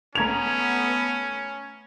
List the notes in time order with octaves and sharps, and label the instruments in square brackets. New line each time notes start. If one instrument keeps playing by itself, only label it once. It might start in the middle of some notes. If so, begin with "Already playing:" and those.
[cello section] A3 B3 [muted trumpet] C#4 [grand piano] A#5 G#6 F7